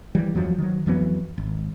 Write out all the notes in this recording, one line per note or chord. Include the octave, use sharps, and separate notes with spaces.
E3 G3
E2 G2 F3 F#3
D#3 F#3
F2 E3 F#3 B3
G#1